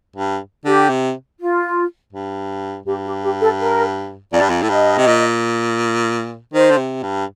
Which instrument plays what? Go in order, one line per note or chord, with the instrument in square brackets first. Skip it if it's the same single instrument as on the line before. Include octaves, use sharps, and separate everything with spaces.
[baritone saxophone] G2
[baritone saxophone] D3 [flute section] G4
[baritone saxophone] C3
[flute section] F4
[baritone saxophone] G2
[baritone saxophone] G2 [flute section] G4
[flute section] G4
G4
A4
A#4
[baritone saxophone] F2 [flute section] D5
[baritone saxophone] G2
F2
A2
[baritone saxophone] G2 [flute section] D#5
[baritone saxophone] C3
A#2
[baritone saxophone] D#3 [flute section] C5
[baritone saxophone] D3
C3
G2